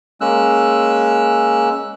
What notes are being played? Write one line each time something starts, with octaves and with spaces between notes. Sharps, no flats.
G#3 A#3 C#4 E6 F#6